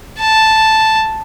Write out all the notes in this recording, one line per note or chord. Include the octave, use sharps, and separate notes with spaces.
A5